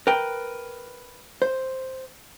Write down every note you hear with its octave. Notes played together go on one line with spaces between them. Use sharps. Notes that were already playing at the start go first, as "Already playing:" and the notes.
A#4 B4 G5
C5